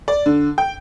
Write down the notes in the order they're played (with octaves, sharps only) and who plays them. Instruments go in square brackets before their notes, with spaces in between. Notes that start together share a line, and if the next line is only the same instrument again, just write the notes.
[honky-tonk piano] D5
D3
G5